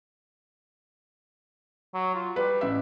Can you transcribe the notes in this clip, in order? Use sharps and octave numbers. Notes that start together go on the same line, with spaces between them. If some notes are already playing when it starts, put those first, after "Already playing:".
F#3
F4
G3 B4
A1 E5